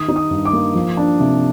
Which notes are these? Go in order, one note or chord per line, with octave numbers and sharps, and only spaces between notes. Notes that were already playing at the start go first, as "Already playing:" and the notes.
Already playing: D#3 D#6
D#4
D#6
G2
D6
A#3
F3
D4
C3